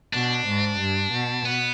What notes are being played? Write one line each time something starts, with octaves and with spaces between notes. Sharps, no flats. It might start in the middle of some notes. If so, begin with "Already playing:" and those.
B2 D4
G#2
G2
B2
B3